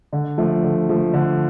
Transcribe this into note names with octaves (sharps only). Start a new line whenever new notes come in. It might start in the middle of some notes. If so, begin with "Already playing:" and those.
D3
F3 A3
D3
F3 A3
D3